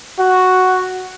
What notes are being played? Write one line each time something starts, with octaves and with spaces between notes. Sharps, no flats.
F#4